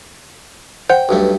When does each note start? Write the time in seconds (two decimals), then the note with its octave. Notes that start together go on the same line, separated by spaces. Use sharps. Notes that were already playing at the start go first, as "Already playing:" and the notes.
0.90 C5 F#5 G5
1.09 B1 G2 A3